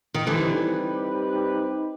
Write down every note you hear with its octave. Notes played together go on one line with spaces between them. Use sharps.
D#3
D3 E3 G3 C4 D#4 G4 B4